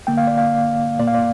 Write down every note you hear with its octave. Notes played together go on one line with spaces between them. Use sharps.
D3 A#3 G5
F5
D5
F5
A#2 A#3 D5
F5
D5